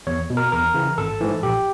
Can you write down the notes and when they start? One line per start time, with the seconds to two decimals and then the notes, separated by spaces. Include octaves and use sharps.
0.07 E2 C#5
0.30 B2
0.37 A#4
0.52 E2 A#4
0.74 C#3 E3
0.98 G#1 A4
1.20 G#2 E3
1.43 A#1 G4